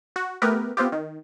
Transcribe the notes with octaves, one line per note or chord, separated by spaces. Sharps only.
F#4
A3 B3 G4 A#4 B4
B3 C4 F4 G4
D#3